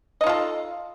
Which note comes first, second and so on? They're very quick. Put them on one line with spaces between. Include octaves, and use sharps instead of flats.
D#5 D#4 F4 A4